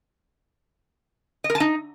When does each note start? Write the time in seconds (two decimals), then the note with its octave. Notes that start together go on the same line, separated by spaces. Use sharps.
1.44 D#5
1.50 A#4
1.55 A5
1.60 D#4